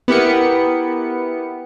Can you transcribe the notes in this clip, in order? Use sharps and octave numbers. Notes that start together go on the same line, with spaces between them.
B3 E4 G4 A#4 C#7